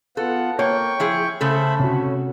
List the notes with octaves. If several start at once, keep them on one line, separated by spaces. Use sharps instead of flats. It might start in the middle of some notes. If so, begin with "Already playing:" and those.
B3 F4 A4 F#5
A#3 C#5 G5 C#6
F3 E4 G#4
C#3 A3 A4 C5 E5 B5
C3 C#4 F#4